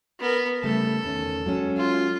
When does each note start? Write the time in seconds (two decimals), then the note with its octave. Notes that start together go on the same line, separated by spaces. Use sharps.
0.20 B3 A#4
0.63 C#3 G3 A3 A4
1.04 E2 D#3 C#4
1.46 F#3 G#3 C#4
1.77 F4